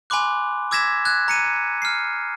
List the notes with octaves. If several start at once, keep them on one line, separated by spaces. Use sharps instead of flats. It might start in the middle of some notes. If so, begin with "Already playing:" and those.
G#5 B5 C6 D6 F#6
D6 E6 G#6 A#6 B6 E7
F#6 G#6
A#5 C#7 D#7
F6 C7